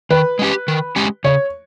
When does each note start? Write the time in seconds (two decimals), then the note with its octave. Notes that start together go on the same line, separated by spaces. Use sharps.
0.10 D#3 B4
0.39 G#3 C#4 G4
0.68 D#3
0.96 G#3 C#4 G4
1.24 C#3 C#5